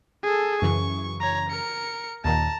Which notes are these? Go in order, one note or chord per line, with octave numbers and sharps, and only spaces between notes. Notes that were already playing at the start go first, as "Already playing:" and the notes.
G#4 A4
F#2 C#3 E3 C#6
C#5 A#5
A#4 C#7
D#2 A#2 D#3 A5 A#5